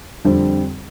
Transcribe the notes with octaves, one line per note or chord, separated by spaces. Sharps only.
F2 D3 G3 C4